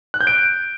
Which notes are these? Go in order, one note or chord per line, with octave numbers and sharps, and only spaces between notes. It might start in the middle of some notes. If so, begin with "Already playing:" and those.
F#6
G6
D7